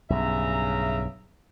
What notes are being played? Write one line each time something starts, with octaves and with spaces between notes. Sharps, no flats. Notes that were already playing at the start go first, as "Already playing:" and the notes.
B1 G2 C#3 E5 A#5